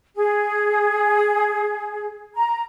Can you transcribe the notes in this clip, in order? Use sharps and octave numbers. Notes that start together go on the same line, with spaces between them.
G#4
A#5